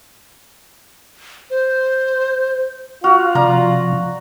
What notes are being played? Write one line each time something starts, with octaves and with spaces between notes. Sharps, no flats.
C5
F4 F#4 F5 F6
C3 F3 D5 A#5